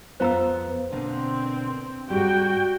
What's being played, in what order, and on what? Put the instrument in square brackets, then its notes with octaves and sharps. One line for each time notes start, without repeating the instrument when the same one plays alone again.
[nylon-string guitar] F2 B3 F4 [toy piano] C5 A#5 E6
[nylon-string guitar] B2 D3 A#3 [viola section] C4
[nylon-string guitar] G#2 G3 [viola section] F#4 G5